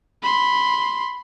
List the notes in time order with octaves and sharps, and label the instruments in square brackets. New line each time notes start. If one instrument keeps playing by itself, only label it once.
[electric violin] B5 C6